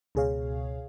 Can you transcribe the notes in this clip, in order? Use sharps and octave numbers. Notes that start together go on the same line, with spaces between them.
C#2 B2 G#4 C#5 F5